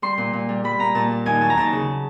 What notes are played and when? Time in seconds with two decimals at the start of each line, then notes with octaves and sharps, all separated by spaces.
0.02 G3 C6
0.18 A#2
0.33 A#2
0.49 G3
0.64 G3 B5
0.79 A#2 A#5
0.95 A#2 A5
1.11 G3
1.26 D#2 G#5
1.41 F#3 A5
1.50 A#5
1.57 D#2 A5
1.73 C#3